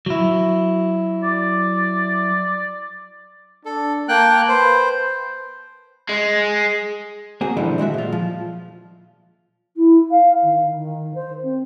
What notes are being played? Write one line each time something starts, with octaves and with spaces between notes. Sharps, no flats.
F#3 E4
D5
D4 A4
A#3 G5 A5 F#6
B4 C5
G#3
A#3 C4 F#4 G#4
A#2 D3 E3 F3 G3 E4
D#3 G#3 F#4 E5
A#2 F4
F3
E4
F5
D#3
D#3
C5
C4